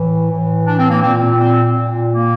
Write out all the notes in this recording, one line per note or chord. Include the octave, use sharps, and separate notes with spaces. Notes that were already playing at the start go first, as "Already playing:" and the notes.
Already playing: A2 E3
A2 E3
D4
C4
A#3
A#2 C4
C4
A#2
A#3